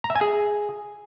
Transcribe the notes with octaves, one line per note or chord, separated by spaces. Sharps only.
A#5
E5
G#5
G#4